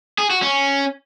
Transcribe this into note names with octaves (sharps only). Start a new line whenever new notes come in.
G#4
F#4
C#4